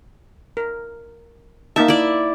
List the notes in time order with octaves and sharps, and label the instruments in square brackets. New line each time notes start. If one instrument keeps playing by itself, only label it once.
[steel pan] A#4
[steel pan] A#3 D#4 A5 [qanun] E5
[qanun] E4 D5